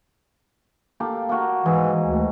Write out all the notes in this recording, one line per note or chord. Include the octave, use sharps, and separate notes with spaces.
A#3 G4 A4
A#3 F#4
G#2 E3
D2